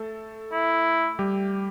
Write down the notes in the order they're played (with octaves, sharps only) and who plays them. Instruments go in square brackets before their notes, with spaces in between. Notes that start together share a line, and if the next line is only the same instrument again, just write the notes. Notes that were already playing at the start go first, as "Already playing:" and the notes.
Already playing: [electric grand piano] A3 A4
[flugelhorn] E4
[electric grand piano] G3 G4